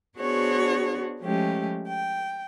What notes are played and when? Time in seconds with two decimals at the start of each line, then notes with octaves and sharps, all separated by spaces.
0.18 B3 D4 F#4 G#4 C5 C#5
1.20 F3 G#3 A3 C#4 G4
1.87 G5